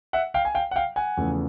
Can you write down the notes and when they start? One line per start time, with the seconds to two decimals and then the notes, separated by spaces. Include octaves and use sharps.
0.13 E5 F#5
0.34 F5 G5
0.45 G#5
0.55 F5 G5
0.71 F#5
0.76 F5 G5
0.96 F#5 G#5
1.17 E2 C#3 F3 A3